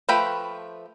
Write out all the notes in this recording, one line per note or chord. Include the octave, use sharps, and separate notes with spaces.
F3 A3 B4 G5 B5